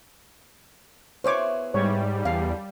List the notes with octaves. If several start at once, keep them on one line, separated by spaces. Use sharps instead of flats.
B3 E4 G#4 C5 C#5 D6
G#2 G3 C#5
E2 D3 D4 F5